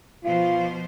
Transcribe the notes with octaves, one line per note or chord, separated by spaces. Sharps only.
B2 F3 F4 C5